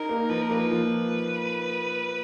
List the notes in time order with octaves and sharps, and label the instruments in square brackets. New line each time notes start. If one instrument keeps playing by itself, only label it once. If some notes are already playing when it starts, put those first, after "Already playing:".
Already playing: [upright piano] D#4 [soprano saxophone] A#4
[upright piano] A#3
[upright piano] F3 [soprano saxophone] B4
[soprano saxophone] A#4
[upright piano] A#3 [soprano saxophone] B4
[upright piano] F3